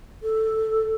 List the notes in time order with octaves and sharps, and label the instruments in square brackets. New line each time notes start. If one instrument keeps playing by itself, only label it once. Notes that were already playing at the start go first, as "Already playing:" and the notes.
[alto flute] A4